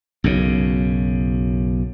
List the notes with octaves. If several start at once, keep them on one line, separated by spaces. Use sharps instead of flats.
B1 F#2 C#3